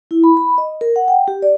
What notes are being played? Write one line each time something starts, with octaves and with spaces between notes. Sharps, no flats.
E4
B5
B5
D#5
A#4
F#5
G5
G4
D5